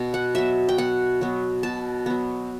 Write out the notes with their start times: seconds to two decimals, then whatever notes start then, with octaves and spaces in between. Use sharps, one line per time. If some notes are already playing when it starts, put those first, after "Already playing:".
Already playing: B2
0.14 F#5
0.35 F#3 B3 E5
0.69 G5
0.78 B2 F#5
1.21 F#3 B3
1.63 B2 A5
2.06 F#3 B3